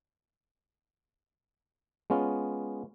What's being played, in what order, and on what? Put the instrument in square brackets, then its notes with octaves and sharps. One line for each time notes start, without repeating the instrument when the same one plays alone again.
[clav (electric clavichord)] G#3 B3 C#4 F4